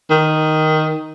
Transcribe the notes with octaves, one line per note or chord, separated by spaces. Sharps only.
D#3